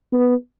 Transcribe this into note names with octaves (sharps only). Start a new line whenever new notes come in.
B3